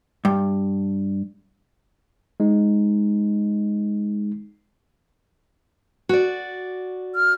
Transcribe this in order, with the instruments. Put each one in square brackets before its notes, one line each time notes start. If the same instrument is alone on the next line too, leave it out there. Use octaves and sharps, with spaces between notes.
[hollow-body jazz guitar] G2
[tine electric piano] G#3 D#4
[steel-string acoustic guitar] F#4 D5
[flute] F6